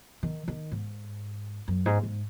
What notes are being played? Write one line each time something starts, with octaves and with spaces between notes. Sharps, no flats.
D#3
D#3
G#2
F#2
G#2
G#2